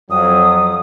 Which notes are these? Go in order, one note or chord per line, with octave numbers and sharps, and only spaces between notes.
F2 F#3 D#6